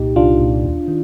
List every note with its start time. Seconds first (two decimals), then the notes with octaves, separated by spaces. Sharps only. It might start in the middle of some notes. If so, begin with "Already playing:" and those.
Already playing: C2 A#2 D#4 G4
0.16 C2 D4 F4
0.40 A#2
0.64 D#2
0.88 D#3